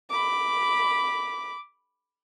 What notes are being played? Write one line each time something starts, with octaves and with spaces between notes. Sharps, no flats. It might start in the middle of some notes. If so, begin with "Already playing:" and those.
B5 D6